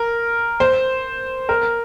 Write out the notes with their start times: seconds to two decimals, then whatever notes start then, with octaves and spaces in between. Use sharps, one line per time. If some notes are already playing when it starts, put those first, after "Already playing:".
Already playing: A#4
0.60 C5
1.49 A#4